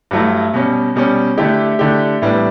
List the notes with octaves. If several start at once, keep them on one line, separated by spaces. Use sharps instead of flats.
G2 F#3 A3 E4
B2 G3 C#4
B2 G3 C#4
D3 A3 E4 G4
D3 A3 E4 G4
A2 E3 G3 B3 D4